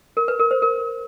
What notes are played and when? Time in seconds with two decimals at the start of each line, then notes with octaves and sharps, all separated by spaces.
0.17 A#4
0.28 B4
0.39 A#4
0.51 C5
0.62 A#4